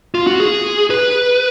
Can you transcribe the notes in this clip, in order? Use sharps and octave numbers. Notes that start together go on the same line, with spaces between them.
F4
F#4
G#4
B4